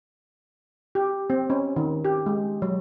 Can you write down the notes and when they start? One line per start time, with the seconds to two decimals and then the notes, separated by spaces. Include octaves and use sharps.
0.95 G4
1.30 C4
1.50 C#4
1.76 D#3
2.05 G4
2.26 G#3
2.62 F#3